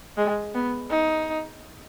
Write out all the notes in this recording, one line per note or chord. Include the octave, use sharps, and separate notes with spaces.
G#3
B3
D#4